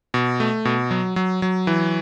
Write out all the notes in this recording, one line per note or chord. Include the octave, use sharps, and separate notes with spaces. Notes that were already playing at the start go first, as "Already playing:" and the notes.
B2
A3
B2
F#3
F#3
F#3
E3